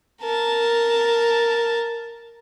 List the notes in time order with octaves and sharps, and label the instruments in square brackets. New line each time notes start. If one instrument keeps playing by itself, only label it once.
[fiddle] A#4 A5